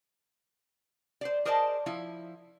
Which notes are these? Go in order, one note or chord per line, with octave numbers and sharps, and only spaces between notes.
C5 D5
G#4 A#4 C5 D5 D#5 A5
F3 E4